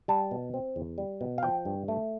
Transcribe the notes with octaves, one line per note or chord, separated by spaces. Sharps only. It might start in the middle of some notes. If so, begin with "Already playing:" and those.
G3 A5
B2
C4
E2
G3
B2
F5
F3 G5
G2
A3